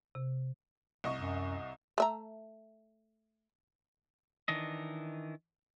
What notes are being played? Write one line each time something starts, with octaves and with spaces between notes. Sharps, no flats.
C3
C2 D#5 C#6
F#2
A3 E5 A#5
D#3 E3 D4 D#5